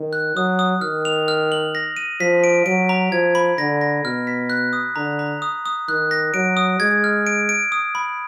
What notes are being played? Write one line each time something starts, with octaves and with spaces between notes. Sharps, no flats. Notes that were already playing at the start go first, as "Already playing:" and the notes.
Already playing: D#3
F#6
F#3 D#6
D#6
D#3 F6
F7
F6
F#7
A#6
D#7
F3 B6
D7
F#3 D7
A#5
F3 G#6
B5
D3 A#6
A#6
B2 F6
B6
F#6
D#6
D3 A#5
A#5
D#6
D#6
D#3 F#6
A#6
F#3 D7
D#6
G#3 G#6
F6
D7
D7
D#6
B5